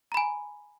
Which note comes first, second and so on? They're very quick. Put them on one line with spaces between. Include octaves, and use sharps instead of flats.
A#5 B5 G#5